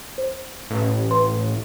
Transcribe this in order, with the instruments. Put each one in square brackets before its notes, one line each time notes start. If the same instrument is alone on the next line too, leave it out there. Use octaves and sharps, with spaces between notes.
[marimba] C5
[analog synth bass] A1
[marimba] B4 C6